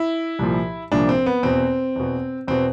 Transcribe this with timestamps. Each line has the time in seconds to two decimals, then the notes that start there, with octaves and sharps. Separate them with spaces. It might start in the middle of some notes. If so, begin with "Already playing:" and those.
Already playing: E4
0.39 C2 A#2 F3
0.92 C2 A#2 F3 D4
1.09 C4
1.26 B3
1.43 E2 B2 C4
1.96 E2 B2
2.48 E2 B2 C4